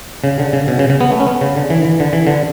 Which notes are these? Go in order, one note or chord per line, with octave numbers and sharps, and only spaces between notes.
C#3
D3
C#3
B2
C#3
C#3
B3
A3
C#4
B3
C#3
D3
E3
E3
D3
E3
D3